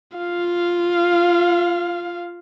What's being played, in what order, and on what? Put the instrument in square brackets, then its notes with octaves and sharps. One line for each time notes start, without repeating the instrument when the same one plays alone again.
[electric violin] F4 F5